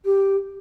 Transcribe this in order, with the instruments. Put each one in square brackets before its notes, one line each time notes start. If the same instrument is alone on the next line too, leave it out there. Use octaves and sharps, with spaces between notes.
[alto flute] G4